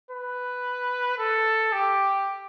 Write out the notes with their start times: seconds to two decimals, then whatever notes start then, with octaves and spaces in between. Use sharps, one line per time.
0.11 B4
1.18 A4
1.73 G4